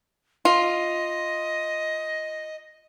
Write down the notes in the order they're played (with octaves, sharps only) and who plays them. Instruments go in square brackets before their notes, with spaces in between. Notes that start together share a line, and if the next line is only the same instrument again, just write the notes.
[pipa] F4 [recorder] D#5